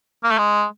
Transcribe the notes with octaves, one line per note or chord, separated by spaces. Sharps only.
A#3
A3
G#3